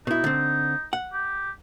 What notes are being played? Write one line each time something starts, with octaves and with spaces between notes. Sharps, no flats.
B2 D#4 E4
D3 C4
F#5
G4